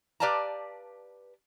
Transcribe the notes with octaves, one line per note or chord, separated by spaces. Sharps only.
G4 B4 D5 F5 A5 A#5